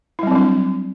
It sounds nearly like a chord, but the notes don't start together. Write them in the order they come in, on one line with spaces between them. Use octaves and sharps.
E4 G3 C4 F#3 D4